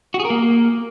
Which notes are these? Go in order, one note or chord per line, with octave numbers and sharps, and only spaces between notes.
F#4
G#4
A#4
A#3